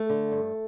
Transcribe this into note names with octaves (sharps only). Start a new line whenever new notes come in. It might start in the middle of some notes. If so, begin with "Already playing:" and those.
Already playing: A3
D3
G2